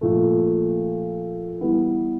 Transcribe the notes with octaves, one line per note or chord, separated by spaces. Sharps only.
A#2 F3 A3
E3 G3 B3 E4